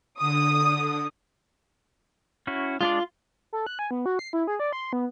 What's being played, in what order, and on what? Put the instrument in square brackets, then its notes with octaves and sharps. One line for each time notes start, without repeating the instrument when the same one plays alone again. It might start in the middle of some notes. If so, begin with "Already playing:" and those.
[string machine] D3 [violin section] D#6
[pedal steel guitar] C#4 E4 F#4
[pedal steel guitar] G#3 D4 D5 [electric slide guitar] F4
[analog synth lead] A4
F#6
G#5
B3
F#4
C7
E4
G#4
D5
C6
B3